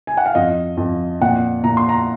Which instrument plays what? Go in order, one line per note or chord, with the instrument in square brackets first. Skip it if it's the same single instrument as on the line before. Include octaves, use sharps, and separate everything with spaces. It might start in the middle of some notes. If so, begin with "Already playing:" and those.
[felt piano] G#5
F#5
F5
F2 D#5
F2
A#2 F#5
A#2 A#5
C6
A#5